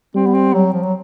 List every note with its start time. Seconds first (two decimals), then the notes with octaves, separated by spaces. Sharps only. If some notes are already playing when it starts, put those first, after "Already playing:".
0.15 G3 C4
0.26 B3
0.34 C4
0.54 F#3
0.73 F3
0.83 F#3